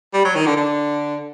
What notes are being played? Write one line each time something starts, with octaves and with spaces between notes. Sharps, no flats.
G3
F#3
D#3
D3
D3